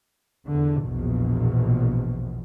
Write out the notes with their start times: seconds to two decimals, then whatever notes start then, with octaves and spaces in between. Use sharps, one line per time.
0.48 E2 D3
0.86 A#1 E2 B2